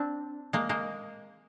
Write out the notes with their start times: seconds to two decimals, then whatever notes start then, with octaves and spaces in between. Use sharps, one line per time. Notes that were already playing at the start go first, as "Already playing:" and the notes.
Already playing: C4 D4
0.53 G#3 A#3
0.69 G#3 A#3